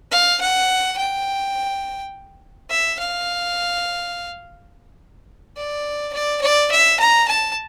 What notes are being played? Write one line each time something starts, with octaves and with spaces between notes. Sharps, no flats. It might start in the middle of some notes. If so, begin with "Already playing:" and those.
F5
F#5
G5
E5
F5
D5
D5
D5
E5
A#5
A5